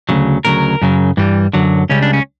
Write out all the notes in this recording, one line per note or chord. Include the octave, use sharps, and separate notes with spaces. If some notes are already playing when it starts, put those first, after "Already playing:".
D2 C#3 F#3
D2 C#3 F#3 A#4
F#2 C#3 F#3
G2 E3 G3
F#2 D3 F#3
C#2 C#3 G3 C#4
D4
C#4